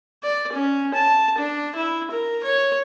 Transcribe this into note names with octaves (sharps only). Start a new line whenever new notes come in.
D5
C#4
A5
D4
E4
A#4
C#5